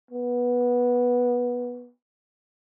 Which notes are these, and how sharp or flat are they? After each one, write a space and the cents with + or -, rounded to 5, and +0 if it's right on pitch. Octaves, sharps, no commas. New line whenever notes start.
B3 -15